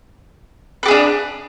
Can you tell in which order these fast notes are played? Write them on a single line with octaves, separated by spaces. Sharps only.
B4 G4 G#4 D4